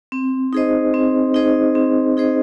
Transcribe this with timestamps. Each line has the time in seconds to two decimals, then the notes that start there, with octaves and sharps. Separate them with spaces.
0.12 C4
0.53 D#4 G#4 C5 D#5
0.94 C4
1.34 D#4 G#4 C5 D#5
1.75 C4
2.17 D#4 G#4 C5 D#5